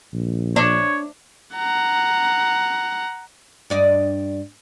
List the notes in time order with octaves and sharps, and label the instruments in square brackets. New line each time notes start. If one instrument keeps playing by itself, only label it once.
[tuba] A#1
[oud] D4 [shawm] C#5
[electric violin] F#5 A#5
[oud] G2 D5 D#5